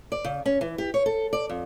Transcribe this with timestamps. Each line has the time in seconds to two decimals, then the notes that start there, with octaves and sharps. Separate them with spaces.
0.12 D5
0.24 C#3
0.46 C#4
0.61 E3
0.78 G4
0.94 C#5
1.06 A4
1.33 D5
1.49 F2